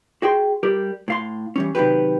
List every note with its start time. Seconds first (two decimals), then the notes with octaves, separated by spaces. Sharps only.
0.22 F#4 G#4 G5 C6
0.63 G3 G4 A#4
1.08 A2 F5 C6
1.56 E3 G3 C#4
1.75 C3 D#3 E3 F#3 G4 B4